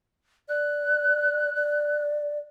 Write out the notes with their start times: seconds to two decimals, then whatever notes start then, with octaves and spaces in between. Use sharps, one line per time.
0.49 D5 F#6
1.56 D5